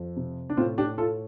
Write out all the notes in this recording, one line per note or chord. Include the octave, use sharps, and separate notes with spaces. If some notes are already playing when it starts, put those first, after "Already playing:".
Already playing: F2
C3
D4
A2 C4 F4
D4 G4
A2 F4 A4